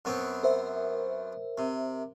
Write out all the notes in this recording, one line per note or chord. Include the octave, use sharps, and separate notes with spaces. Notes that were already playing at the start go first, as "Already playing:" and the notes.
F#2 B3 C4
A#4 C5 E5
C3